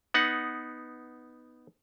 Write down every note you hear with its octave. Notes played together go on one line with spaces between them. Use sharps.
B3 D#4 F#5